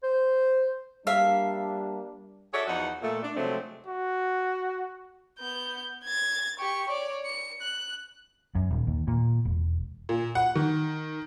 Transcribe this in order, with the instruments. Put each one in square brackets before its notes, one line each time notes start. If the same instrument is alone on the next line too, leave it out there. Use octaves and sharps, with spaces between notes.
[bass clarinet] C5
[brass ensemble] G3 A#3 D4 [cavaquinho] E5 F5
[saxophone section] F#4 G#4 A4 C#5 D5 E5
E2 F3 D#4 F#4 F#5
A#2 A3
D4
C3 F3 F#3 G#3 A3 C4
[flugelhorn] F#4
[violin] B3 G6
G#6 A6
G4 C#6
C#5 D5
C#7
F#6
[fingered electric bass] F#2
D#1
D#2
A#2
E1
[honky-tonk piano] A#2
F#5
D#3